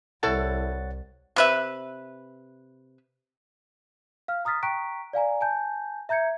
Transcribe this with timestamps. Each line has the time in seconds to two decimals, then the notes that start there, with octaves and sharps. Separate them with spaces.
0.23 C2 E4 A4 C#5 F#5 A5 A6
1.36 C3 B4 E5
4.28 F5 F6
4.45 A#5 D#6 F6 A6 B6
4.63 G5 A#5 C#6 F#6 B6 D7
5.13 D5 F5 G#5 A#5
5.41 G#5 A5 G6
6.09 E5 A#5 G6 G#6 C#7